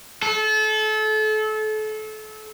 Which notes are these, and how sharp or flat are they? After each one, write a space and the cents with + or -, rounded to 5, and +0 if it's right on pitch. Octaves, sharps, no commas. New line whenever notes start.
A4 -30